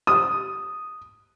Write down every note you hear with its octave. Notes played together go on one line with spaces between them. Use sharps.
D#6